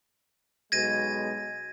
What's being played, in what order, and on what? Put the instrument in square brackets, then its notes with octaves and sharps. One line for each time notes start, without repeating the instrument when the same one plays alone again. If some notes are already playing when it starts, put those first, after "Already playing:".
[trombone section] B1 B2 G#3 [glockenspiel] G#6 A#6 D#7